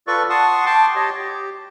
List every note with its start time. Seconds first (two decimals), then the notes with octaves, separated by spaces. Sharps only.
0.07 F4 A4 B4 D5 C#6
0.30 F#5 A5 C6 C#6 D#6
0.66 G5 A5 C6 D6
0.95 G4 C#5 D#5
1.18 G4